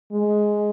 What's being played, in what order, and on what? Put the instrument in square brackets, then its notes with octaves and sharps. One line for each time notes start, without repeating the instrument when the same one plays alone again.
[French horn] G#3